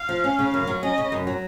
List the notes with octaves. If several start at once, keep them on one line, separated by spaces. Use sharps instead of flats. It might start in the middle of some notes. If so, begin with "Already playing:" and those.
Already playing: F5
F3
C#4
C#3
F#2
F#3
C#4 D#5
C#3
F#2
F#3